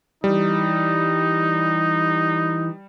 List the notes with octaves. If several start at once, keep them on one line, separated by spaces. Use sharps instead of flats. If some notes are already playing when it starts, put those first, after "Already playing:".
E3 G3 D#4 E4